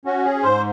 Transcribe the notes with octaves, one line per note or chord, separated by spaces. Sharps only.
C#4 F#4
G#4
G#2 C5